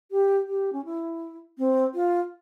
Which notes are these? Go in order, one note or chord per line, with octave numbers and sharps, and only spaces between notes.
G4
G4
C#4
E4
C4
F4